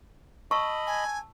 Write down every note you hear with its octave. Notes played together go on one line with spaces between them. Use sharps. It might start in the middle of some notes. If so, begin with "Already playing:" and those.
D#5 A5 B5 C#6 E6
G#5